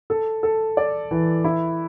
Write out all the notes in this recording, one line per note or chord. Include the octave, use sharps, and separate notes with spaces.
A4
A4
D5
E3
E4